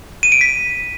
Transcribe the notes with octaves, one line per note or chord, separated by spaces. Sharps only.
D#7
D7
B6